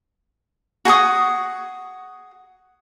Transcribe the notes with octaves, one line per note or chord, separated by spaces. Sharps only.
F#4 G#4 C#6 D#6